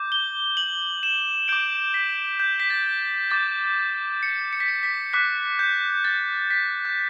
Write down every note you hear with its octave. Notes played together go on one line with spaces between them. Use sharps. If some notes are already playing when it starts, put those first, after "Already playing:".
Already playing: D6 G6
G7
F#7
E7
D6 G6 D7
B6
G6
B6
A6
D6 G6 A6
C#7
C#7
B6
C#7
B6
D6 F#6 B6
G6
A6
B6
G6